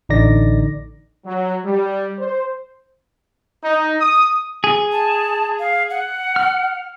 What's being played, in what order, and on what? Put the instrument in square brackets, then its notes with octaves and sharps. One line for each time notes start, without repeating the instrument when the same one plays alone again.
[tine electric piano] A1 D3 D#4 D5 A#6
[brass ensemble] F#3
G3
C5
[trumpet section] D#4
D#6
[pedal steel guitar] G#4
[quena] A5
F5
F#5
[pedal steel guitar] F6